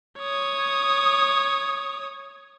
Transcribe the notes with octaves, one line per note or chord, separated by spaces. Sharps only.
C#5 D#6